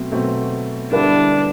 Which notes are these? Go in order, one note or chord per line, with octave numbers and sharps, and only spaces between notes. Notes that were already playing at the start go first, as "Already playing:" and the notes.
Already playing: B2 F#3 A3 C4
B2 F#3 A3 C4
D3 G3 B3 D4 E4 B4